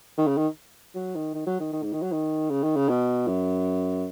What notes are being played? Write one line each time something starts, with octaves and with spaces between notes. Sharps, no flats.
D#3
C#3
D#3
F#3
D#3
D#3
F#3
D#3
D#3
G#2
D#3
F#3
D#3
C#3
D#3
C#3
B2
F#2